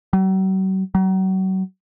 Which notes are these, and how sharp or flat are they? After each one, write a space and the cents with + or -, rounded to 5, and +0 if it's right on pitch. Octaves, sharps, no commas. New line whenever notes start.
F#3 +45
F#3 +35